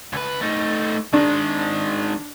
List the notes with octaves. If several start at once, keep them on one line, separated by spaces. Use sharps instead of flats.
C#2 B4
A3 D#4
D#3 G#3 D4